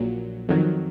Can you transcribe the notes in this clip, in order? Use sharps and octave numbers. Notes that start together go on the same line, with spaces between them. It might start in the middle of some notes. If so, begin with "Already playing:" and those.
Already playing: A#1 A#2 F#3
F2 D#3 F#3